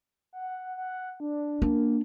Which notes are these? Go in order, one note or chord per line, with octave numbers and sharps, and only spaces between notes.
F#5
F#5
D4
A#3 D4